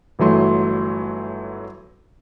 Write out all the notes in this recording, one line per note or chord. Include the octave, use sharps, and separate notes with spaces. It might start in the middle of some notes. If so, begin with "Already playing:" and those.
G1 E3 F#3 A3 C6